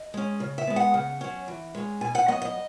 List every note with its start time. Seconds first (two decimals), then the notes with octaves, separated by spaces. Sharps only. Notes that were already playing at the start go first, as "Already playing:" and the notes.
Already playing: D#5
0.14 G#3 C#4
0.40 C#3
0.58 E5
0.67 G#3 B3
0.76 F#5
0.94 C#3
1.21 F#3 C#4
1.48 E3
1.75 G#3 C#4
2.01 B2 G#5
2.15 F#5
2.28 F#3 B3 D#5
2.42 D#5